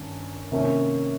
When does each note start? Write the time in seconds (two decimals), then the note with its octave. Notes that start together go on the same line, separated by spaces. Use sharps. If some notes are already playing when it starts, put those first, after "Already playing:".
Already playing: G2 D#3 C#4
0.52 C3 D#3 A#3 C#4